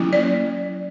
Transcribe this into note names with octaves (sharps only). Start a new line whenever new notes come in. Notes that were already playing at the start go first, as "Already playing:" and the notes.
Already playing: F#3 A#3 C#4 E4
D5